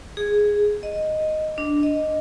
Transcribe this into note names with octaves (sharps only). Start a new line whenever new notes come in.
G#4
D#5
D4
D#5